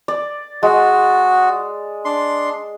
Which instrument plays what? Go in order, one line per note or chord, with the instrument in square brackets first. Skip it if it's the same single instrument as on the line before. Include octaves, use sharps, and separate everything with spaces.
[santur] D5
[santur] G#3 [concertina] F#4
[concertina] D4 C6